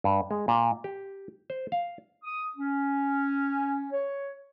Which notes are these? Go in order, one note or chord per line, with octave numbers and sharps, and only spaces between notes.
G2
G#3
A#2
G4
C5
F5
D#6
C#4
C#5